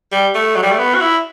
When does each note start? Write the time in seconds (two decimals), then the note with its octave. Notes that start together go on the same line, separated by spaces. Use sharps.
0.12 G3
0.35 A3
0.56 F#3
0.62 G3
0.72 A3
0.79 B3
0.95 F#4
1.01 E4